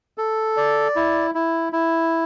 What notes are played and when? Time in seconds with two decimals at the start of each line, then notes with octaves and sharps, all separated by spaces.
0.18 A4
0.57 D5
0.96 E4
1.35 E4
1.73 E4